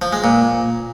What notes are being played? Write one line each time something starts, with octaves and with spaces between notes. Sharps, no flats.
F3
G#3
A#2